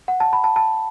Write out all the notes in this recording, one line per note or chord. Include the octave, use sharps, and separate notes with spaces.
F#5
A5
B5
A5
A5